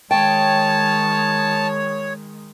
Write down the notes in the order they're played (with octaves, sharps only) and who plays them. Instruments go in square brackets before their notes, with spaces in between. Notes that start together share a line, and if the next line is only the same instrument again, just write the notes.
[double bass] D#3 G#3 [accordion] C#5 [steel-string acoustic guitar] G5 [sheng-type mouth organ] A5